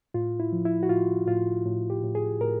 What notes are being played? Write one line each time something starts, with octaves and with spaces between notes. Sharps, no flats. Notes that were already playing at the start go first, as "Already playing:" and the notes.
A2 F4
E4
F3
E4
F#4
A2 F4
A2 F4
A2
G4
A2
G#4
A2 A#4